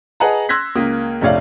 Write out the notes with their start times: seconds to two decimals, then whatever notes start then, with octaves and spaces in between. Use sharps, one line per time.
0.20 G#4 B4 D#5 F#5 A5 A#5
0.49 C6 E6 F#6 G#6 A#6 B6
0.75 C#2 A#3 D#6
1.21 F1 A#1 A3 C#5 D5 F5